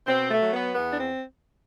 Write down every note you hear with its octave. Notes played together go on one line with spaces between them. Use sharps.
B2 C4
A3
F#3
B3
E2 B3
D4
C4